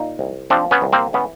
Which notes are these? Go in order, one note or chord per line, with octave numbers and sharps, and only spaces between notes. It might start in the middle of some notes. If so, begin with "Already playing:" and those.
Already playing: A#2 D#4
C2
F3 C4 D4
B3 C#4
C2
A#3 C4
E3 B3 C#4